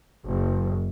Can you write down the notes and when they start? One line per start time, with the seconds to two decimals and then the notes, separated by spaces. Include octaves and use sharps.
0.24 F#1